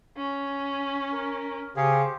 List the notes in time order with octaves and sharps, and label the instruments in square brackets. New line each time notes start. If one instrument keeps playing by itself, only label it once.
[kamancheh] C#4
[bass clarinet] A#4
[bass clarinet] C#3 [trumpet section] G4 C5 [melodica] G#4